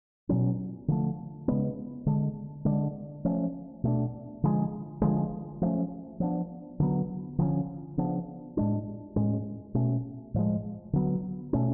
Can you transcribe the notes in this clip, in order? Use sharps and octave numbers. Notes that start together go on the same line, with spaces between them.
B2 F#3 C#4
D3 F3 A3
C#3 G#3 B3
D3 G#3 D4
D3 G#3 D4
F3 A3 C#4
B2 A3 D4
D3 F3 G#3
D3 F3 G#3
F3 A3 C#4
F3 B3 D4
D3 F#3 B3
D3 F3 A3 C#4
C#3 F3 B3 D4
A2 G#3 D4
A2 G#3 C#4
B2 A3 C#4
A2 F3 G#3
D3 F#3 B3
B2 A3 C#4